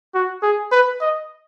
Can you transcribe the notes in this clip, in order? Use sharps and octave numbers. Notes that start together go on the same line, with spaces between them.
F#4
G#4
B4
D#5